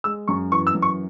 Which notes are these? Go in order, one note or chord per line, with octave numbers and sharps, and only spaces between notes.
G#3 E6
F#2 C#6
E3 C#6
E6
F#2
C#6